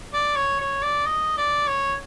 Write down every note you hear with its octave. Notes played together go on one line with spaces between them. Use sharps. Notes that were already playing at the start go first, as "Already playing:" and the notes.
D5
C#5
C#5
D5
D#5
D5
C#5